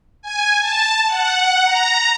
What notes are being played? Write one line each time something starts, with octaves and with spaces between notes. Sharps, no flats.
G#5
A5
F#5
A#5